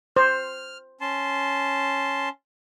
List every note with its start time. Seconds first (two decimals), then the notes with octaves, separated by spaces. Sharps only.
0.16 C5 F6
1.01 C#4 A5 C6